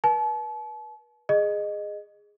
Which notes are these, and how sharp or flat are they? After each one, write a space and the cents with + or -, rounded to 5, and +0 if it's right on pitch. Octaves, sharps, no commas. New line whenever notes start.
B4 -40 A5 -40
G#4 -5 D#5 -20